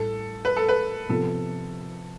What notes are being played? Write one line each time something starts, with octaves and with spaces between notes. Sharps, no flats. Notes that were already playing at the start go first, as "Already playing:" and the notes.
Already playing: A1 A2 G3 A4
B4
A4
B4
C3 F3 B3 F4 A4